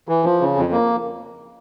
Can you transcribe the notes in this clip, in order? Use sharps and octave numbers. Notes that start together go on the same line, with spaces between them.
E3
F3
C#3
F2
A#3